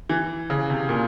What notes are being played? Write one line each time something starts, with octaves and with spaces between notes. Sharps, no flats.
E3
C#3
C3
A#2